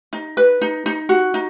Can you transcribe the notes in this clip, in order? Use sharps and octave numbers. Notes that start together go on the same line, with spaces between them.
D#4
B4
D#4
D#4
F#4
D#4